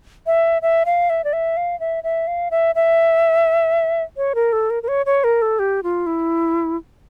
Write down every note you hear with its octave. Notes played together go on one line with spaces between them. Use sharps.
E5
E5
F5
E5
D5
E5
F5
E5
E5
F5
E5
E5
C#5
A#4
A4
A#4
A#4
C#5
C#5
A#4
A4
G4
F4
E4